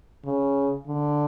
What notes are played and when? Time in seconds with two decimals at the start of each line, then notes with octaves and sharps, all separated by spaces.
0.25 C#3
0.88 D3